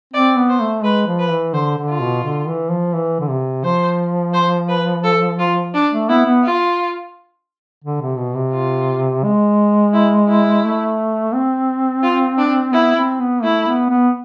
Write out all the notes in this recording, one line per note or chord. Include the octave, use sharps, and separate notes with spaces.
C4 D5
B3
C5
A3
G#3 B4
F3
B4
E3
D3 C5
D3
F4
B2
D3
E3
F3
E3
D3
C3
F3 C5
C5
B4
A4
F4
D4
A3
B3 E4
B3
F4
D3
C3
B2
C3
F4
G#3
E4
E4
A3
C4
F4
D4
B3 E4
C4
B3
A3 E4
B3
B3